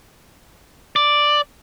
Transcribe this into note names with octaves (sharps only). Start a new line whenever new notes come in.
D5